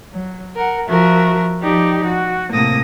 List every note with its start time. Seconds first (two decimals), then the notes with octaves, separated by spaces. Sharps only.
0.12 F#3
0.55 A#4 F#5
0.87 F3 F#4 A#4 E5
1.61 F3 D#4 G4 D5
2.05 F#4
2.52 A2 C3 A#3 D#6 A#6